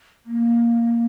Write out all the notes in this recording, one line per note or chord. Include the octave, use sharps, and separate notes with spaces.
A#3